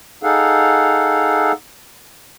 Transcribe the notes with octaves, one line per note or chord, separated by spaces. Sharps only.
D#4 G#4 A4 F5 F#5